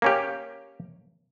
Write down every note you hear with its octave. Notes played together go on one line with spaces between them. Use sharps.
A#3 C#4 G4